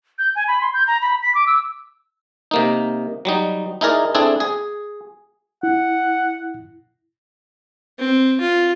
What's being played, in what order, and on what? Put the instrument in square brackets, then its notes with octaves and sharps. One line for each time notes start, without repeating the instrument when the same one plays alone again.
[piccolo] G6
G#5
B5
C6
G6
A#5
B5
B6
D6
E6
[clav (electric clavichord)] C3 A#3 D#4
F#3 G3 D#4
D#4 E4 G#4 A#4 D5
C4 D4 E4 G#4 A4
G#4
[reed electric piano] E4 [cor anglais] F#5
[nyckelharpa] C4
F4